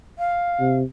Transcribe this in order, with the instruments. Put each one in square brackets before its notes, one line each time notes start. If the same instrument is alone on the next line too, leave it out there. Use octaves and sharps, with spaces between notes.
[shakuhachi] F5
[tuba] C3